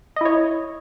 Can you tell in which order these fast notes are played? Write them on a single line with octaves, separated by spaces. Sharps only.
D#5 E4 C#5